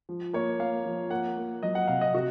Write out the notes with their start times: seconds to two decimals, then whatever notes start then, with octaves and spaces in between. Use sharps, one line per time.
0.09 F3
0.33 A#3 C#5
0.59 A#3 F5
0.85 F3
1.10 A#3 F#5
1.37 A#3
1.63 F#3 D#5
1.75 F#5
1.88 C3 F5
2.01 D#5
2.14 C3 F#4